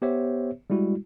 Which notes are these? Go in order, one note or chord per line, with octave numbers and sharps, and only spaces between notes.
B3 G4 C5 C#5 E5
G3 G#3 E4 F#4